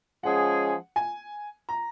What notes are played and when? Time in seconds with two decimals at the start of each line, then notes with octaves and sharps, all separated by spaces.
0.23 F3 G#3 C#4 G#4 F#5
0.96 G#5
1.69 A#5